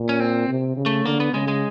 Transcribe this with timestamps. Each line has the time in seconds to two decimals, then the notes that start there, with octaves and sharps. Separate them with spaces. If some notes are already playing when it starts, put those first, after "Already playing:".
Already playing: A#2
0.09 C#4
0.20 C4
0.49 C3
0.77 C#3
0.86 A3
1.05 D3 A#3
1.20 B3
1.33 C#3 G#3
1.48 G#3